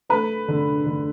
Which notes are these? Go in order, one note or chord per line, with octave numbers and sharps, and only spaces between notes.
A3 B4
D3
D3